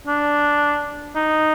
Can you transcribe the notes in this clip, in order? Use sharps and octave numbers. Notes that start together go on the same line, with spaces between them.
D4
D#4